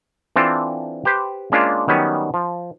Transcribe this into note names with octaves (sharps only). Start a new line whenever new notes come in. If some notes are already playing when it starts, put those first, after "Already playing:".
E3 C4 D4 F4 A4
G4 B4 C5
G#3 A#3 C#4 D4 F4
D#3 F#3 G3 B3 C#4
F3